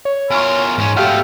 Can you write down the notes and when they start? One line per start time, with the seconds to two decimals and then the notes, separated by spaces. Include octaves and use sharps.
0.05 C#5
0.30 E2 A#4 G#5 C6 C#6 F6
0.78 E2 G#2 C#4
0.97 B2 A3 G4 F5 G5 F6